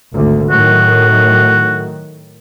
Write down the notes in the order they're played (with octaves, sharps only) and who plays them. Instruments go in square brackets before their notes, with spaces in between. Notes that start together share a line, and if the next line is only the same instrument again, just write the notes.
[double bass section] G#1 D2
[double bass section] A2 D#3 F#3 [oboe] F#4